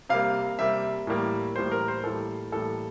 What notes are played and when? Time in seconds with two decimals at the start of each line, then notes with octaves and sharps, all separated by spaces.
0.09 C3 G3 A#3 F5
0.59 C3 G3 A#3 E5
1.07 A2 E3 G3 A#3
1.56 A2 E3 G3 A#3 C5
1.72 A#4
1.88 C5
2.04 A2 E3 G3 A#3 A4
2.52 A2 E3 G3 A#3 A4